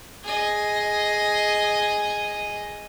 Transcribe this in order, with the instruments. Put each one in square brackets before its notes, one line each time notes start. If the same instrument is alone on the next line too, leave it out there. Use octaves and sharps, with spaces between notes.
[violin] G#4 D#5